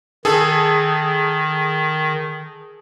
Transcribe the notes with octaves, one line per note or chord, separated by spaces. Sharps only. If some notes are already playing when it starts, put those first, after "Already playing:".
D#3 G#4 A4